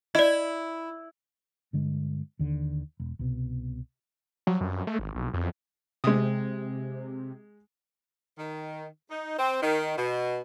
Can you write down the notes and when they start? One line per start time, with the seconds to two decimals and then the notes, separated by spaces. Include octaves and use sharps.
0.15 E4 D5 D#5
1.73 G2 D3 G#3
2.39 D#2 D3
3.00 E1
3.19 C2 B2
4.47 F#3
4.61 F#2
4.87 A3
4.99 G#1
5.15 B1
5.34 F2
6.04 C3 G#3 D#6
8.38 D#3
9.10 D#4
9.38 C4
9.62 D#3
9.97 B2